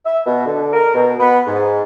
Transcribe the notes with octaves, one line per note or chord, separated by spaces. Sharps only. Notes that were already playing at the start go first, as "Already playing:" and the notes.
E5
B2
D3
A#4
B2
B3
G#2